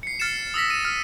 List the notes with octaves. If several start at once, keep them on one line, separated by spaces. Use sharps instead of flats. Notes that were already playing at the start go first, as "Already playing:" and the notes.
C7 C#7
F6 A6 C7 C#7 E7
D#6 E6 A#6 B6
D#7 E7
F6